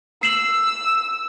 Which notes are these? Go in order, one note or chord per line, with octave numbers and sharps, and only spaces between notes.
E6 C7 E7 F#7